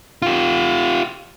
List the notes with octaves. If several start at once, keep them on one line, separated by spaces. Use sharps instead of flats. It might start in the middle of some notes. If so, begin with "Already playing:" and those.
F4 G4